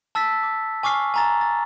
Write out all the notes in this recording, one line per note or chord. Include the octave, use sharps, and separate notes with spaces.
A5 E6 A6 B6
D6
G#5 C#6 D6 F6 C7
G#5 A#5 A6
A6